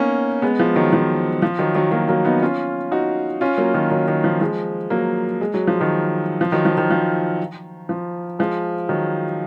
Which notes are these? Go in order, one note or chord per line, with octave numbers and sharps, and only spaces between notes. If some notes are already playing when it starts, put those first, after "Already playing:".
Already playing: A#3 B3 C#4 D#4
G#3 B3
F3 G#3
D#3 F#3
F3
F3
D#3 F#3
D#3 F#3
F#3 A#3
F#3 A#3
B3 D#4
C#4 F4
D#4 F#4
C#4 F4
F#3 A#3
D#3 F#3
D#3 F#3
D#3
F3
F3 G#3
F#3 A#3
G#3
F#3
F3
D#3 F#3
F3
D#3 F#3
F3
D#3
F3
F3
F3 G#3
D#3 F#3